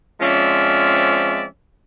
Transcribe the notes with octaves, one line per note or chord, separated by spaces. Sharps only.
F3 G#3 C4 C#4 D5 E5